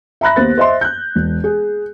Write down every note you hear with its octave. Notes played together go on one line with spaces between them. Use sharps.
E5 A#5 B5 F#6 A#6
D#2 A#3 B3 C5 A6
C5 D#5 E5 C6
F#6 G6
E1
G#4